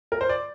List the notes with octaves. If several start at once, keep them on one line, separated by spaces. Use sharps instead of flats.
A#4
C5
D5